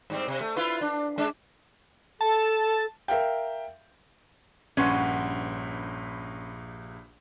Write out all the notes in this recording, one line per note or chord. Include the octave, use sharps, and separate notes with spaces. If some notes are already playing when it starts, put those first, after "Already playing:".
G#2 G3 C4
C3
A3
E4 F4 B4
D4
G#3 D4
A4 A5
A#4 E5 F5 G5
A#1 G2 C#4 B4 F#5 C6